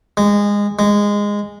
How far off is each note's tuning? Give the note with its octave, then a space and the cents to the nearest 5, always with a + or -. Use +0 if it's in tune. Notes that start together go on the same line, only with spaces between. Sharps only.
G#3 -20
G#3 -15